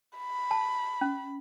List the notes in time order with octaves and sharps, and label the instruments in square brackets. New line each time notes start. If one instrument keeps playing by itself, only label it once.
[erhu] B5
[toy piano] A5
C#4